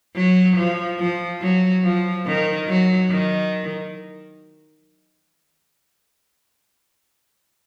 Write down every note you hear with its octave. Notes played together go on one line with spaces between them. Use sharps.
F#3
F3
F3
F#3
F3
D#3
F#3
D#3